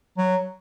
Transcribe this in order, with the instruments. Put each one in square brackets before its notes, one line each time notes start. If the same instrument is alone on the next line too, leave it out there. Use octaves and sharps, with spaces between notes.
[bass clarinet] F#3